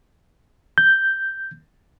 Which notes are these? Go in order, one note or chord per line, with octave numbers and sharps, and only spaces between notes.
G6